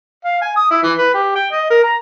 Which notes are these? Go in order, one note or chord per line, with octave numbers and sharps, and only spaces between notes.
F5
G#5
D#6
E4
E3
B4
G4
G5
D#5
A#4
A#5